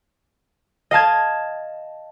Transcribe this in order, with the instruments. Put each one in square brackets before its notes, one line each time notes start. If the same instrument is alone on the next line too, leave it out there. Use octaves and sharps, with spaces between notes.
[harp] D#5 F5 A5 G#6